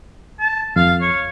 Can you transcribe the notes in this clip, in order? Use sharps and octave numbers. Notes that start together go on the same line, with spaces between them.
A5
F2 F5
C#5